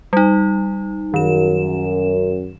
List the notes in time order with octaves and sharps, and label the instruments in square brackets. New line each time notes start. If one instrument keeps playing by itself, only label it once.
[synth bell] G3 D#4
[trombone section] F#2 [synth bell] D#3 E7